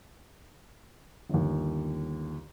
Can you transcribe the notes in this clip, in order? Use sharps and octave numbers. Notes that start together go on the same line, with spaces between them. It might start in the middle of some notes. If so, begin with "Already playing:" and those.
G1 D#2